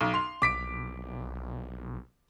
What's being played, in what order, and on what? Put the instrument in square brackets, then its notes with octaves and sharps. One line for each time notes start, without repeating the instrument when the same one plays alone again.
[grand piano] B1
C6 F7
[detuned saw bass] B1 [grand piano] D6 B6 D7